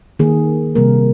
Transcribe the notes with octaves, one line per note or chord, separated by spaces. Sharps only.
D#3 A#3 G#4
C3 G3 A#3 A#4